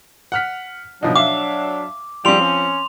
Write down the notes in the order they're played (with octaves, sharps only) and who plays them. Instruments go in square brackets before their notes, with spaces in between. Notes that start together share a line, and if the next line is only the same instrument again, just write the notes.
[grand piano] F#5 F6 B6
[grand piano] B2 F3 D#4 [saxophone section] F#3 D4
[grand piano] E5 F5 [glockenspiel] D6
[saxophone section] G#2 D3 G3 [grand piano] F3 C4 [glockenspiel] C6 F7
[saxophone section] C#4